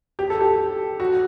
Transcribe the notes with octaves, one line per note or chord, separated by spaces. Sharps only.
G4
A4
G4
F#4